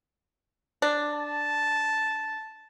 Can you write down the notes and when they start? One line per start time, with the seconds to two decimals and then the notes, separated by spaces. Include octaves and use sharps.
0.82 D4
1.14 A5